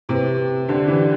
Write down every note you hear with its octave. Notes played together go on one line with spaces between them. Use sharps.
C3 E4 G4 B4
D3 D4 G4 D5 G5
E3